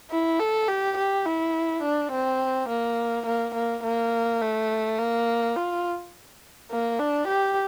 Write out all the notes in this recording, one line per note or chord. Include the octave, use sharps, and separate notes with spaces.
E4
A4
G4
G4
E4
D4
C4
A#3
A#3
A#3
A#3
A3
A#3
F4
A#3
D4
G4